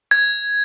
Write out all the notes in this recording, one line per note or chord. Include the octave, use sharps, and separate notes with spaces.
G#6